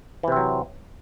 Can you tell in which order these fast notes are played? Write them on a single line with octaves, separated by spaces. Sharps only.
E3 C3 C4 F#3